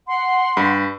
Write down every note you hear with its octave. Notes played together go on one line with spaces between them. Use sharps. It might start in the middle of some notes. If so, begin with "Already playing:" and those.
F#5 C6
G2 B5